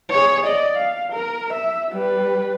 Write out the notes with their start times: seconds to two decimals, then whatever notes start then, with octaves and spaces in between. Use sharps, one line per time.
0.11 G#4 C#5
0.46 D5 D#5
0.77 F5
1.12 A#4
1.53 E5
1.91 G3 B4